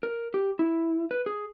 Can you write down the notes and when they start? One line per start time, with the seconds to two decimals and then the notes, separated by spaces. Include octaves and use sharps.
0.03 A#4
0.34 G4
0.59 E4
1.11 B4
1.26 G#4